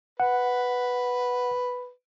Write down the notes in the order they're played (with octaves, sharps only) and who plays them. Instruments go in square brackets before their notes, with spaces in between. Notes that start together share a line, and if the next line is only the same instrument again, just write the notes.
[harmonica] B4 [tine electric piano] F#5